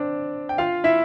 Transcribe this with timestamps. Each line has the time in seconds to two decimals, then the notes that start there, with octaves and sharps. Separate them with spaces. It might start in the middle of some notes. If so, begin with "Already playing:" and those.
Already playing: C4 D4 D5
0.49 G5
0.58 F4 F5
0.84 E4 E5